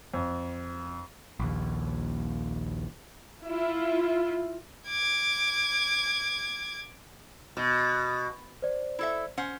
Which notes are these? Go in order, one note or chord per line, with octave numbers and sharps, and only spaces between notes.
F2
A#1 D#2
E4 F4
D6 G#6
B2
C5 D5
E4 A4 E5
C#4 C5 F#5